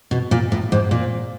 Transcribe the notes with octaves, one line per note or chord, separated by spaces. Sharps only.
B2
A#2
A2
G#2
A#2